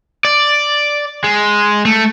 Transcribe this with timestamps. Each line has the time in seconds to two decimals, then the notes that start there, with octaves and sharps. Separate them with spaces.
0.25 D5
1.24 G#3
1.85 A3